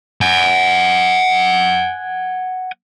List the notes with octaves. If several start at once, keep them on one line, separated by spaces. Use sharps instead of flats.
F#5 G#5